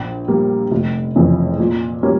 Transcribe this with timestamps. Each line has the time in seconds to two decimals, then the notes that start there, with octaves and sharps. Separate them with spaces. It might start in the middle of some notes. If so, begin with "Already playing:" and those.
Already playing: A#1
0.28 A#2 G3 A#3
0.72 F1
1.15 F2 C#3 E3 A3
1.59 A#2
2.03 G3 A#3 C#4